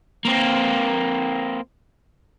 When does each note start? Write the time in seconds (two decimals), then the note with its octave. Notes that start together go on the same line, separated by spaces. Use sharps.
0.25 A#3 C4